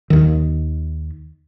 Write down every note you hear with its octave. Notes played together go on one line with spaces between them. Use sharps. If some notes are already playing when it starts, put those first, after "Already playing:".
D#2 D#3